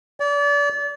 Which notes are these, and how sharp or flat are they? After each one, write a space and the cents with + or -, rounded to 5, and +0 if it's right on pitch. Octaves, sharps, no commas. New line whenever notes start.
D5 -35